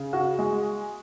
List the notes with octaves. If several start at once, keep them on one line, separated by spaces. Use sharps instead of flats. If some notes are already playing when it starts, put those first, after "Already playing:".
Already playing: C#3
F#4
G#3